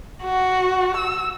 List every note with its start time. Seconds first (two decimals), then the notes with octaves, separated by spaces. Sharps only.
0.23 F#4
0.96 E6